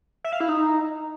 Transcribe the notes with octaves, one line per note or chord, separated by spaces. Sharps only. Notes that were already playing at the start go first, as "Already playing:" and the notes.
E5
F5
E4
D#4